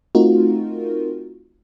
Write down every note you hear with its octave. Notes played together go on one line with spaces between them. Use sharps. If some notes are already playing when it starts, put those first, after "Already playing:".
A3 C4 D#4 F4 F#4 A#4